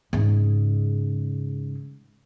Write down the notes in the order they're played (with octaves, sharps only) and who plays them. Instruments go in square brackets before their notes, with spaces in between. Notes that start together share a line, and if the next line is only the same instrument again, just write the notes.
[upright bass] G#2 C#3